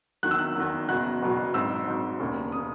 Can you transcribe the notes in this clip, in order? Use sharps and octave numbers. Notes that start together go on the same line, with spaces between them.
E2 D#3 F#3 F#6
E6
F#6
E2 D#3 F#3
F#1 E2 B2 F#3 F#6
F#1 E2 B2 F#3
G#1 G#2 F#3 E6
G#1 G#2 F#3
E1 D#2 C#3
C#3 D#6